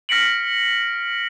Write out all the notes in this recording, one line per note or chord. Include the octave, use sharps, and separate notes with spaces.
F6 A#6 B6 C#7 D7 F#7